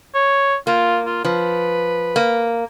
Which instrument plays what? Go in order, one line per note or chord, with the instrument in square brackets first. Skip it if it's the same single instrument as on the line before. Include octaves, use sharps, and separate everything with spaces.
[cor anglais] C#5
[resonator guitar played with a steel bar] A#3 [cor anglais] F4
[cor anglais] F4
[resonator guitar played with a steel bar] F3 [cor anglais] B4
[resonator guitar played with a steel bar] A#3